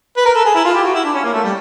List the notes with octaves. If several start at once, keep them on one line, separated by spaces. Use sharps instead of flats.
B4
A#4
A4
G#4
E4
F4
G4
F#4
E4
D4
C#4
A#3
A3
G3